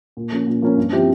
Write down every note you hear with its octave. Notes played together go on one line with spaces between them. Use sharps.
A#2
F3 A#3 C#4
A#2
F3 A#3 C#4
G2
F3 C4 E4 G4